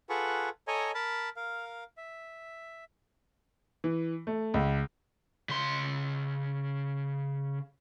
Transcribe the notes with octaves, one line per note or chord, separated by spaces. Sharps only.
F4 G#4 A4 B4 F#5 C#6
A4 C#5 D#5 G#5 A#5
A#4 A5 B5
A#4 F5
E5
E3
A3
C#2
C#3 C6